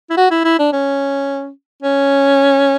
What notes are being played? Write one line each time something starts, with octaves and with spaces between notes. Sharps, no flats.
E4
F#4
E4
E4
D4
C#4
C#4